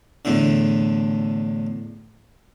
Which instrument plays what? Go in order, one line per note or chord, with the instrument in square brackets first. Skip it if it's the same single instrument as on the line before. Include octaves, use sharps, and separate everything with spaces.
[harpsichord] E2 A2 D3